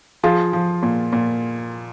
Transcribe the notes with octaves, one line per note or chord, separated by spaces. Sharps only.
F3 F4 G#4
F3
A#2
A#2